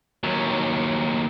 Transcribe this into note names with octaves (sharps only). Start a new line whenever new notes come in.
D#2 F#3